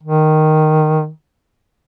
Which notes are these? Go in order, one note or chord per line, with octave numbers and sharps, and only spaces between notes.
D#3